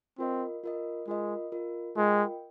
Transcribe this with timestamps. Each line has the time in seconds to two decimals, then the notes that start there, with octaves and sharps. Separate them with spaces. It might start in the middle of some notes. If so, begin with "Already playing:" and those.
0.18 C4 F4 A#4 D#5
0.64 F4 A#4 D#5
1.08 G#3 F4 A#4 D#5
1.52 F4 A#4 D#5
1.96 G#3 F4 A#4 D#5 G5